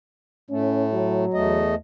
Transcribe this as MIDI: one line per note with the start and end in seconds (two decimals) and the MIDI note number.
0.50 1.25 45
0.50 1.25 57
0.50 0.88 61
0.93 1.62 54
1.34 1.75 40
1.34 1.75 57
1.34 1.75 75